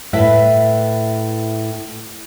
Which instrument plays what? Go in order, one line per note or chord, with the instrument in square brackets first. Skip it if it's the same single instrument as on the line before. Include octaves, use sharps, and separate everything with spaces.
[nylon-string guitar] A2 E4 B4 E5